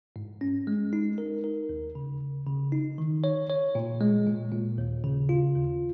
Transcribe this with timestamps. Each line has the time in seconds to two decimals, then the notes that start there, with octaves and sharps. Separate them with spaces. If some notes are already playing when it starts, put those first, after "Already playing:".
0.16 G#2
0.41 C#4
0.67 G#3
0.93 D#4
1.18 A#4
1.44 A#4
1.69 D#2
1.95 C#3
2.21 C#3
2.47 C#3
2.72 D#4
2.98 D#3
3.24 C#5
3.50 C#5
3.75 A#2
4.01 G#3
4.27 A#2
4.52 A#2
4.78 D#2
5.04 C#3
5.29 F4
5.55 D#2